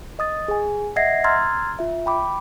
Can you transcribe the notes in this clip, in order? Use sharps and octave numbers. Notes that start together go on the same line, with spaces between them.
D#5 D#6 A6
G#4 G#5
D#5 E5 F#5 G#6 A#6 C7
A#5 C6 E6 F6 G#6 A6
F4 E5
G5 B5 D6